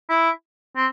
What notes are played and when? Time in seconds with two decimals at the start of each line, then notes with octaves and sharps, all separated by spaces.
0.09 E4
0.76 C4